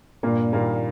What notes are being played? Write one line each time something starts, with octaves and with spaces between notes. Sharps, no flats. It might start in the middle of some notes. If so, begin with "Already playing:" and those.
G2 A#2 A#3
A#2 D#3 G3 A#3